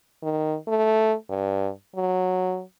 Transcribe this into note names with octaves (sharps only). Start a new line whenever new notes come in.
D#3
A3
G2
F#3